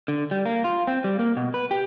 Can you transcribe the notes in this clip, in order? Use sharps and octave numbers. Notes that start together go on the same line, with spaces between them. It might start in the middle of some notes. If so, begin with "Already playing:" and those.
D3
G3
A#3
F4
C4
G3
A#3
B2
B4
G4